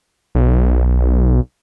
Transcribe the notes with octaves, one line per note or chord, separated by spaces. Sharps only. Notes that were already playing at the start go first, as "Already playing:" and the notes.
B1